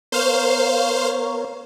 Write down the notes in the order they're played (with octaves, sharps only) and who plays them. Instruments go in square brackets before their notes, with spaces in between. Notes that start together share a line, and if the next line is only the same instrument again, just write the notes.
[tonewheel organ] B3 A#4 C#5 [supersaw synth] C5 F5